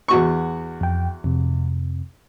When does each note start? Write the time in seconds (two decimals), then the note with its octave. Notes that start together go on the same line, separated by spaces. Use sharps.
0.08 E2 F#4 C#6
0.81 F2 G5
1.24 F2 C3